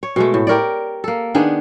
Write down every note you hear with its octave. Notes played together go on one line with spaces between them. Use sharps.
C#5
B2 G#3 A3
A2
G4 A#4 C#5 D5
A#3 A4
D#3 B3 D4 G#4